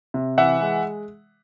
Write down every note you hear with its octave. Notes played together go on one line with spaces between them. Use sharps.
C3
E3 E5 F#5
G#3